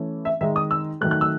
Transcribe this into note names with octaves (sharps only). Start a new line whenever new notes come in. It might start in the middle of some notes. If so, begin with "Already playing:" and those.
Already playing: E3 A3 C#4
E5
D#3 G#3 D#4 E5
D#6
E6
D#3 F#3 A3 F#6
F#6
E6